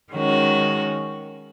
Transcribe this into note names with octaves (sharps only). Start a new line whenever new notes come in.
D#3 G#3 C#4 F#4